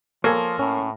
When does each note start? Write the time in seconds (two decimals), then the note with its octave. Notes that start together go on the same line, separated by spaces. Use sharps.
0.24 F3 A#3 A4 C#5 F5 G#5
0.59 A2 C#4